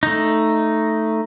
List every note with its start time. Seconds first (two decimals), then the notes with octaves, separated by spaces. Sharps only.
0.03 A3 D#4